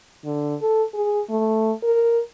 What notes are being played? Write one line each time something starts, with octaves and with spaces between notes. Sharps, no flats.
D3
A4
G#4
A3
A#4